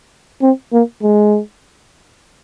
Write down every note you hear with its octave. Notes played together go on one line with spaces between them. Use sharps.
C4
A#3
G#3